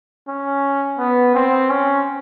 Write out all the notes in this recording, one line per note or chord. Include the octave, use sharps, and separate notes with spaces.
C#4
B3
C4
C#4